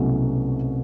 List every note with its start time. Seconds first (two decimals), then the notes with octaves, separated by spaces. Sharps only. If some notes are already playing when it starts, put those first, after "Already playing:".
Already playing: C2 B2 F#3 A3 C#4